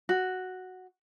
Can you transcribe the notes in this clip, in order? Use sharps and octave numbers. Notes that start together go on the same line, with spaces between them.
F#4